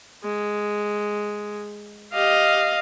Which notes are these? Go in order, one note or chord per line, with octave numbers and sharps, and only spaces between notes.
G#3
G4 D#5 F5